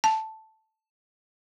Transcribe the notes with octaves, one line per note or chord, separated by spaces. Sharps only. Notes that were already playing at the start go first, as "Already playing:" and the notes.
A5